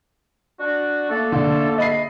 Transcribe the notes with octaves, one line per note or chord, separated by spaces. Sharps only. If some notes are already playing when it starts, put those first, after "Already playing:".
D4 F#4
A3 A#3 A4
D3
D#5 B5 C7